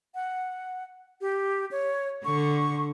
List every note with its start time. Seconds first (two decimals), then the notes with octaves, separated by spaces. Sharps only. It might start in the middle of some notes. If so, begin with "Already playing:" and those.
0.15 F#5
1.21 G4
1.71 C#5
2.25 D3 C#6